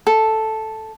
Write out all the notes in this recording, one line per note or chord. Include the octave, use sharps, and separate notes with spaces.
A4